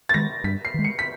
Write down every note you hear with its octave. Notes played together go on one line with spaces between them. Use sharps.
A6
D#3 G#3 A#6
G2 B6
C7
D#3 G#3
C#7
B6